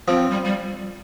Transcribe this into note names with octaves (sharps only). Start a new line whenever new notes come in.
F3 C4
G3
G3